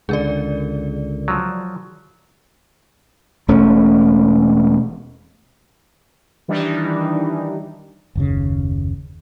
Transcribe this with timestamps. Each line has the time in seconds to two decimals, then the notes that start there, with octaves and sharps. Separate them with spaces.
0.09 C#2 D3 G#4 A#4 D5
1.28 F3 F#3
3.48 E1 A3 C#4
6.48 D#3 E3 G3 D4 D#4
8.15 F#1 D#2 C#3